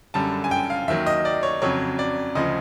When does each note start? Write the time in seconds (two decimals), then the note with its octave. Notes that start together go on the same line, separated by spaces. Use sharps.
0.14 F#2 D3 G3 A5
0.44 G#5
0.51 G5
0.70 F5
0.87 D#2 D#3 F#3 E5
1.06 D#5
1.25 D5
1.43 C#5
1.62 F2 C#3 F#3 C#5
1.99 D5
2.35 D2 C#3 F3 D#5